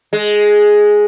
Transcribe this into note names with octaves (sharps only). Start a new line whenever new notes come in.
G#3